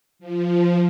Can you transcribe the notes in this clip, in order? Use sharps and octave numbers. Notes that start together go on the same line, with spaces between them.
F3